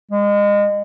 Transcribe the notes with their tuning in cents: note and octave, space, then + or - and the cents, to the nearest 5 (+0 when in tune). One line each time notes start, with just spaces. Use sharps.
G#3 -30